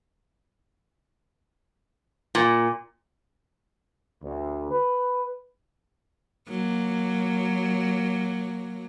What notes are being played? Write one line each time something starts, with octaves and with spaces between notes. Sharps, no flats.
A#2
D2
B4
F#3 A#3